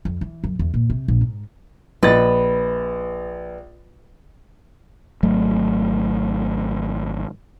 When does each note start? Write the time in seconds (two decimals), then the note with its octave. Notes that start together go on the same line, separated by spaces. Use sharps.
0.05 F2
0.21 E3
0.44 F#2
0.59 E2
0.74 A#2
0.90 C3
1.08 A#1
1.21 G#2
2.03 A#1 B4 D#5 A6
5.23 G#1 F#3 A3